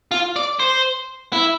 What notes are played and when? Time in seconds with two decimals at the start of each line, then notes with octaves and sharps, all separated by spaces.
0.11 F4
0.36 D5
0.60 C5
1.33 E4